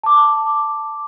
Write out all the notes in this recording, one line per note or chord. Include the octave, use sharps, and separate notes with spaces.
A5 D6